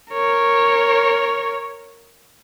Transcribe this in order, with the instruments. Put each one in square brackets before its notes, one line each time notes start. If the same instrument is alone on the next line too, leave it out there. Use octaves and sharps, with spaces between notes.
[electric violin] A#4 C#5